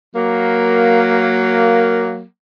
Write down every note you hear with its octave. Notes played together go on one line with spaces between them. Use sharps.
F#3 A#3